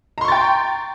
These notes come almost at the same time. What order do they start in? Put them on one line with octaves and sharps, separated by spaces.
A#5 C6 C#6 A6 G5